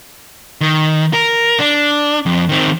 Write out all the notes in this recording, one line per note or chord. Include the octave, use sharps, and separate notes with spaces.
D#3
A#4
D4
F2
D#3 C4